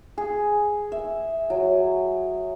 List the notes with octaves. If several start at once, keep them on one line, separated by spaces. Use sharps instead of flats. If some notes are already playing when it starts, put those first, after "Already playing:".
G#4
E5
F#3